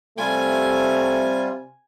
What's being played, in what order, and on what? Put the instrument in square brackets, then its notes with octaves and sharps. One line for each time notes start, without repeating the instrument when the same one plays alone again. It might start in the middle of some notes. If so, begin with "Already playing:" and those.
[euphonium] C3 [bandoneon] G3 F4 [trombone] A3 [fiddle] G#5